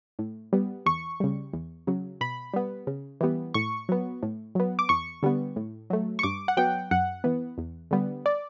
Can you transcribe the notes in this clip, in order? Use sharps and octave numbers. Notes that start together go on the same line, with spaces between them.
A2
G3 B3
E2 C#6
C#3 G3
E2
C#3 F#3
B2 B5
G3 B3
C#3
E3 G3 B3
A2 C#6
F#3 B3
A2
F#3 B3
D6
E2 C#6
D3 G3 B3
A2
F#3 A3
C#6
G2 D6
F#5
F#3 B3 G5
F#2 F#5
E3 B3
E2
D3 G3 B3
D5